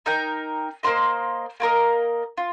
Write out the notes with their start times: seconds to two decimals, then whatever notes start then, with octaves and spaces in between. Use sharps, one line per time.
0.06 D#4 A#4 G5
0.83 A#3 F4 C5 D#5
1.60 A#3 F4 A#4 D#5
2.38 F4